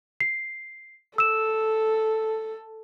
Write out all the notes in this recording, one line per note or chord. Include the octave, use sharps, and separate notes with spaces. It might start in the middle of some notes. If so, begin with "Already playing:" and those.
C7
A4 E6 E7